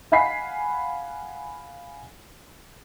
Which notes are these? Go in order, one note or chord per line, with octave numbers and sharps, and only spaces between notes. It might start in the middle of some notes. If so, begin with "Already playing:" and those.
F5 F#5 G#5 B5 B6 C7